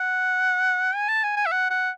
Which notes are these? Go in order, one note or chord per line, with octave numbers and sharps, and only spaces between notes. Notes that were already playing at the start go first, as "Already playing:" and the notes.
Already playing: F#5
G#5
A5
G#5
G#5
E5
F#5
F#5